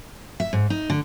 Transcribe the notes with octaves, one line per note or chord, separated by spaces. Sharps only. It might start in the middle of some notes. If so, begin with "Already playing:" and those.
E5
G#2
D#4
D3